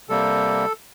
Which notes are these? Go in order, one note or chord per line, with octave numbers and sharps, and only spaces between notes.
C3 G3 A#3 A4